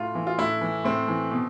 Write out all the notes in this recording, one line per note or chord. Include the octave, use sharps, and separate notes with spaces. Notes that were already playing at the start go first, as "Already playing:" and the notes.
Already playing: A2 F4
E3
F4
A2 E4
E3
A2 C4
E3
B2